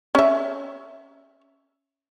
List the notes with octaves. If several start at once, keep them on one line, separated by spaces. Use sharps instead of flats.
C#4 E5